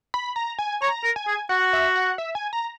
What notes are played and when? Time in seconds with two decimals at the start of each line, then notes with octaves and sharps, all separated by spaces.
0.14 B5
0.36 A#5
0.59 G#5
0.82 C#5 A#5
1.04 A#4
1.16 G#5
1.27 G#4
1.49 F#4 F#5
1.73 E5
1.96 F#5
2.18 E5
2.35 G#5
2.53 A#5